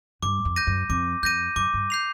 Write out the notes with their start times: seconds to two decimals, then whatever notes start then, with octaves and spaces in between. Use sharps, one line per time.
0.23 G2 D6
0.45 F2
0.56 G6 A#6 D#7
0.67 F#2
0.90 F2 D6
1.23 F2 G6 A#6 D#7
1.56 F#2 D6
1.74 G2
1.90 G6 C7 F7